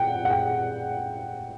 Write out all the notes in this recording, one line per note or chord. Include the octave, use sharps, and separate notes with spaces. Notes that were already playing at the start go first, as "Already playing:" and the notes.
Already playing: F#5 G5
F#5
G5